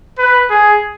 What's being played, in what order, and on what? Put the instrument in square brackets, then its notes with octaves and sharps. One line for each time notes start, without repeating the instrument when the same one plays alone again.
[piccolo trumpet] B4
G#4